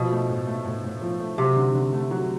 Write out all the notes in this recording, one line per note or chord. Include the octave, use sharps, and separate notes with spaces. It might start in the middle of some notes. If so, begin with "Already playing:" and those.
Already playing: B2 F3
A3
A2
A3
A2
A2
F3
A3
C3 F#3
D3
D3
A3
F#3